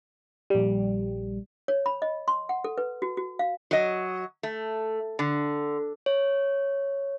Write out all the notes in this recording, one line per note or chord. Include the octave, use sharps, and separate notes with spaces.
A#1 G3
C#5
B5
D#5
C6
F#5
A4
B4
F#4
F#4
F5
F#3 D#5
A3
D3
C#5